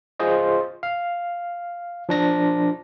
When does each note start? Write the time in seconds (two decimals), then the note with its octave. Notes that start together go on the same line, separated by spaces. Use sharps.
0.20 F4 G#4 C5 D#5
0.83 F5
2.09 F3 D4 A#6